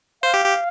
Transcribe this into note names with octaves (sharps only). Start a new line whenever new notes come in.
C5 F5
G4
G4